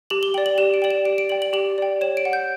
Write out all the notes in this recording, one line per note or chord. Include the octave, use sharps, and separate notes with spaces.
G4 F#7
G7
D5 G5 F#7
F#7
G4 E7
D7
D5 G5 F#7
E7
G4 D7
D7
D5 G5 F#7
F#7
G4 F#7
D5 G5
C#5 E7
D7
F#5
G6